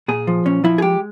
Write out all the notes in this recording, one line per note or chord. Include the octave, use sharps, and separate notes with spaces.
A#2 G#4
F3
A#2 C#4
F3 E4
G#4
G#3 G4